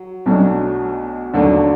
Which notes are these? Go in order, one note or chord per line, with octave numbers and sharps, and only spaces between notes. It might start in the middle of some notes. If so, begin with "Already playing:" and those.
Already playing: F#3
B1 B2 F#3 A3 D4
D#2 D3 F#3 A3 D4